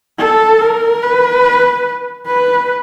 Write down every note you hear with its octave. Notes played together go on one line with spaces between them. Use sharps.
A4
A#4
B4
B4